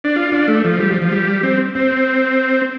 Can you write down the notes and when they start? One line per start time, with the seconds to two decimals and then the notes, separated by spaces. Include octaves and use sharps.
0.04 D4
0.16 F4
0.32 D4
0.48 A3
0.64 F3
0.80 G3
0.91 F3
1.02 F3
1.12 G3
1.43 C4
1.75 C4